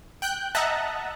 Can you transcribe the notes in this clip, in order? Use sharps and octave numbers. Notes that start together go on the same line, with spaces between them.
G5 F#6 G6
D#5 E5 F#5 A5 A#5 F#6